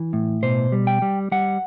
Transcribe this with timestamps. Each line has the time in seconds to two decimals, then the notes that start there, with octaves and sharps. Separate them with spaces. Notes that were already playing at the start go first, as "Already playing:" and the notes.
Already playing: E3
0.13 A2
0.43 B2 C5
0.72 G3
0.87 G5
1.02 G3
1.32 G3 F#5